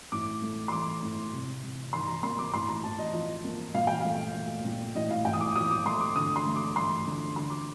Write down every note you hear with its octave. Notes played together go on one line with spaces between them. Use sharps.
A2 D6
A3
C6
A3 D6
A2
C3
C3
D#3 C6
A#5
A#3 C6
D6
A2 C6
A#5
A2 A5
D#5
F3 D#5
A#3
A#2 F5
G5
A3 F5
A3
A#2
A2 D#5
F5
A2 G5
D#6
D6
F3 D#6
D6
A3 C6
D6
D3 D#6
C6
A3
D6
A3 C6
D3
D3 C6
D6